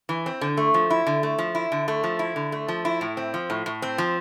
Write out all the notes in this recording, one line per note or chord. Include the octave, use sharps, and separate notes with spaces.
E3
C4
D3
A3
F3
E4
D3
A3
F3
E4
D3
A3
F3
E4
D3
A3
F3
E4
A2
C4
F3
A2
A2
C4
F3